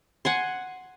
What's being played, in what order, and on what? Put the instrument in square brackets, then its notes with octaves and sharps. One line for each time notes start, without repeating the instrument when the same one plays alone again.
[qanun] F#5 G#5 C6